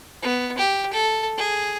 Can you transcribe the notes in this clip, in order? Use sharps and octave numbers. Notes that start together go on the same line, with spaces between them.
B3
G4
A4
G#4